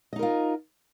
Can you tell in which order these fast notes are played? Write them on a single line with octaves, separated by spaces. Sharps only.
D#5 D#4 A#4 F4